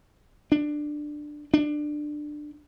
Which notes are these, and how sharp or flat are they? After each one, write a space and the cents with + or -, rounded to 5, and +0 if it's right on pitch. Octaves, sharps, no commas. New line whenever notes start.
D4 +15
D4 +20